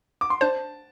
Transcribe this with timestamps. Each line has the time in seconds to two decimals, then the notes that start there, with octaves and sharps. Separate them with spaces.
0.21 D6
0.30 C6
0.41 D4 C5 A5